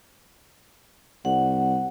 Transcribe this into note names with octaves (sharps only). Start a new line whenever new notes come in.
C2 F#5